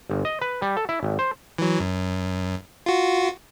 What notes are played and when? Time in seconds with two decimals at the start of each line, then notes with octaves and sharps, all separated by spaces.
0.10 G1
0.25 D#5
0.42 B4
0.62 G3
0.77 A4
0.89 E4
1.03 G#1
1.19 C5
1.58 E3 F#3
1.80 F#2
2.86 F4 F#4